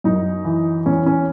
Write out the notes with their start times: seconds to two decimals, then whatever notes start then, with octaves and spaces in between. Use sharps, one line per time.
0.04 F#2 D#4
0.45 E3
0.86 E2 C#4
1.06 C#4